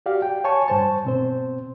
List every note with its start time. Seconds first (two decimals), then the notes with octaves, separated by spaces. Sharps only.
0.06 F#4 G4 D5 F5
0.22 G5
0.44 C#5 G#5 A5 C#6
0.68 G2 C5 A5
1.05 B2 C4 C5